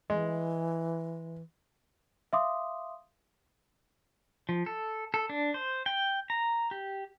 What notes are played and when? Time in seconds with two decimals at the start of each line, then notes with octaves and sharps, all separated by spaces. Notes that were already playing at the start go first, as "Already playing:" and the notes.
0.10 E3 G#3
2.33 E5 F5 C6 D6 D#6
4.49 F3
4.66 A4
5.14 A4
5.30 D4
5.54 C5
5.86 G5
6.30 A#5
6.71 G4